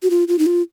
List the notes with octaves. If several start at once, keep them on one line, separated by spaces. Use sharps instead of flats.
F#4
F4
F4
D#4
F4